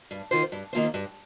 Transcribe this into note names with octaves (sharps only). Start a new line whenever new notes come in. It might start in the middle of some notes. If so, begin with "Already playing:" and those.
G2
D#3 A#3 F4 C5
G2
D#3 A#3 F4 C5
G2